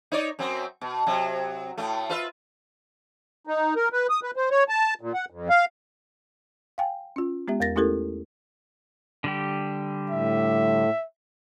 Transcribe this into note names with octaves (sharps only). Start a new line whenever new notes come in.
D#4 C#5 D5
F#2 F#3 C4
B2
C3 F#3
A2 A3
F4 B4 E5
D#4
A#4
B4
D#6
B4
C5
C#5
A5
A#2
F#5
F2
F5
F5 G5 G#5
C#4 F4
G#3 B3 G4 E5
E2 A#4 A6 A#6
A3 C#4 E4 G4 A4 A#4
D3 G3 G4
A2 E5